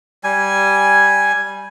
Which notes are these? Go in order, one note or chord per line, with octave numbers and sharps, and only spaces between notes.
G3 G#5